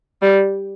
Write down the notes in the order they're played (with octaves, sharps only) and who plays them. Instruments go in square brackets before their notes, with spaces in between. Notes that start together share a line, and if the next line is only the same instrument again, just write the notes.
[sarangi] G3